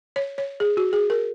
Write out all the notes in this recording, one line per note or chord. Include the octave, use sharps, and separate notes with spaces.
C#5
C#5
G#4
F#4
G#4
A#4